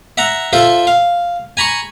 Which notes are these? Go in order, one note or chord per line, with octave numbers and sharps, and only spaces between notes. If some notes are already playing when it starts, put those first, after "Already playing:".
E5 F#5 A#5
F4 A4 C5 E5
F5
G#5 A#5 B5 C#6